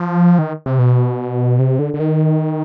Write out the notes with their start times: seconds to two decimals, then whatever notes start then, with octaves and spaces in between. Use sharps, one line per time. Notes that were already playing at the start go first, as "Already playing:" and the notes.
Already playing: F3
0.39 D#3
0.66 C3
0.79 B2
1.59 C3
1.79 D3
1.94 D3
2.00 D#3